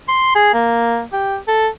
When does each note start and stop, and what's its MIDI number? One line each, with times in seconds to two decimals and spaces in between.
0.08 0.30 84
0.35 0.54 68
0.54 1.02 58
1.13 1.37 67
1.48 1.68 69